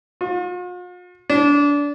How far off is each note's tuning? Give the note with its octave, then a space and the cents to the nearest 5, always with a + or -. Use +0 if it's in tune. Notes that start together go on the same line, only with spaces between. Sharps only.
F4 +45
D4 -25